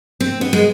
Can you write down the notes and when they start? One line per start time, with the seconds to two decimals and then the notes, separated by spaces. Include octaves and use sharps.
0.20 C4
0.41 B3
0.53 G#3